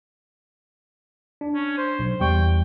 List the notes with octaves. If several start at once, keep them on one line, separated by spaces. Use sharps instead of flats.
D4
C#4
C5
B1
E2 G3 G5 C#6